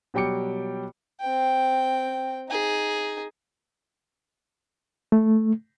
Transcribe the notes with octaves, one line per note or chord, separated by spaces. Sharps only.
B2 F#3 G3 G5 D6 C#7
C4 G5
D#4 G#4
A3